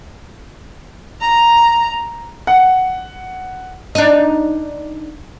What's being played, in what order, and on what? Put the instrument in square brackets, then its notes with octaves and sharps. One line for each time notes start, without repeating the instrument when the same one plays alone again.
[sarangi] A#5
[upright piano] F#5
[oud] D4 D#4